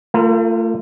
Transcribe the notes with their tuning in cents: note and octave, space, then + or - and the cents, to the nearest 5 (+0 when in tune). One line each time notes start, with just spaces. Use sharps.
A3 +35 F4 -20 A#4 +0